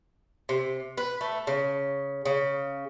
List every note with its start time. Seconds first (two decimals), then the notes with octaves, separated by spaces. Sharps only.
0.49 C3
0.97 B4
1.21 A3
1.47 C#3
2.25 C#3